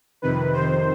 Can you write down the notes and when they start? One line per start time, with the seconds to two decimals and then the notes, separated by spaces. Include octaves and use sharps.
0.22 F2 C3 D#3 B4
0.53 F2 C3 D#3 C5